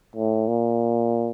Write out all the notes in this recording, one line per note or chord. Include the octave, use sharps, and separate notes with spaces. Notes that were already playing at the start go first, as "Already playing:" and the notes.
A2
A#2